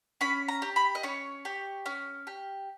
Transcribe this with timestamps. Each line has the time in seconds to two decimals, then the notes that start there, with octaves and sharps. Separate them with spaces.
0.21 C#4 B5
0.48 A#5
0.62 G4
0.76 B5
0.95 D#5
1.03 C#4 C#5
1.45 G4
1.86 C#4
2.27 G4